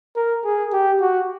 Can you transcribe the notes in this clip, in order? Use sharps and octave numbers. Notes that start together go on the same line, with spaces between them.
A#4
G#4
G4
F#4